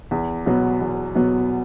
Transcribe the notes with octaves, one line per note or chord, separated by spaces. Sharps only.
E2
B2 F#3 B3
E2
B2 F#3 B3